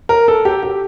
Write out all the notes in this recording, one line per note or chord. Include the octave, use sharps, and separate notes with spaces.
A#4
A4
G4
G4